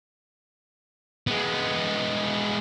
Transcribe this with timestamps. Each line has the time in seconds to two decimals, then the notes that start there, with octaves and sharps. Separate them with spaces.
1.27 G#3 B3